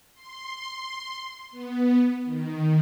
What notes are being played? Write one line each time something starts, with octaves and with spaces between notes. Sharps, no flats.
C6
B3
D#3